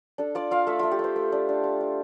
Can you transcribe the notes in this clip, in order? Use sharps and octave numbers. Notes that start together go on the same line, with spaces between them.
D4 A4
F4 D5
F4 F5
A3 E5
A3 F4
G4
A3 C5
A3
D4
D4
F4
F4